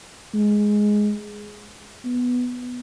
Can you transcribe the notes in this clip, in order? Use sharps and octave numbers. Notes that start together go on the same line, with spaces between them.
G#3
B3